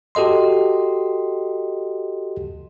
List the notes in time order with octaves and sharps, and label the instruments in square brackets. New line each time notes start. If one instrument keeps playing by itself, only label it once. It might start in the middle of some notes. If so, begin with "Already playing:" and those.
[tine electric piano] F#4 G4 A4 D#5 C6